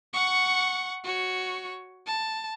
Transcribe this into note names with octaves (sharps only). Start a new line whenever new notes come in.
F#5 C#6
F#4 C#5
A5